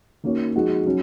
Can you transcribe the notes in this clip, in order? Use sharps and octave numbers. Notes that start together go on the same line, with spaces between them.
D#3 A#3 C#4 F#4 C#5
F3 G#3 D#4 F#4
F#3 C#4